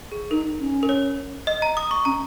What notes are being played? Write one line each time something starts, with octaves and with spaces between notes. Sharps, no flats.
G#4
D#4 A#4
C#4
A#4
C#5
D#5
A#5
D#6
C#6
C#4 A#5